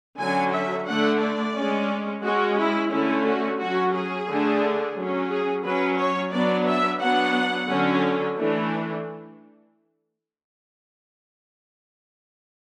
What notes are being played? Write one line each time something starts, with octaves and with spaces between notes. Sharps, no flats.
D3 F#3 C#4 G#5
E5
D3 A3 D4 F#5
D5
G#3 C#4
G#3 C#4 F#4
E4
D3 A3 C#4 E4
F#4
F#3 C#4 F#4
G#4
D3 A3 D4
F#3 C#4
G#4
F#3 C#4 B4
C#5
F#3 B3 D4 D5
E5
F#3 B3 D4 F#5
D3 F#3 C#4
E3 A3 D4